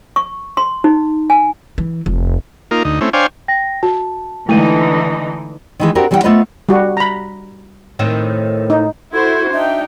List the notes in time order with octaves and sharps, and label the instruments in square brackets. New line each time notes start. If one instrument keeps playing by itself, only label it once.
[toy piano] C#6
C6
D#4
G#5
[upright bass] E3
F1
[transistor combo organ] A#3 D#4 F4 A#4
D2 D#4
A3 C4 C#4 E4
D4 C5 C#5 F5 G5 G#5
[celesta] G5 A#6
[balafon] F#4 [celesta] A5
[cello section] D3 E3 D#4 [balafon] G#3 A3 [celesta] E4 D#7
[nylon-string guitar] D#3 E3 G#3
C4 D4 F#4 G4 A#4 B4
E3 G3 A#4 C#5 F#5 G5
A3 B3 F4 B4 C5 D#5
[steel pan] G3 F#4
A#5 B5
[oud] A2 D#3 C4
[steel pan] D#4
[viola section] E4 F#4 C5 [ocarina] A4 [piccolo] G#6
[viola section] D4 D#4 G5 [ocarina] E5